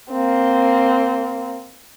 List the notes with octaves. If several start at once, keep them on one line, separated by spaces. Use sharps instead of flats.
A#3 C4